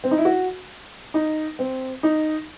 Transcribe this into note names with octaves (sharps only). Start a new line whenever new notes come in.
C4
D#4
E4
F#4
D#4
C4
D#4